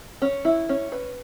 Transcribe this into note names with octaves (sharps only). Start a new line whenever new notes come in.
C#4
E4
C#4
B4